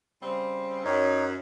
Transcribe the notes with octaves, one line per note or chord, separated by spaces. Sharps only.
C#3 G3 C4
F#2 D#4 C#5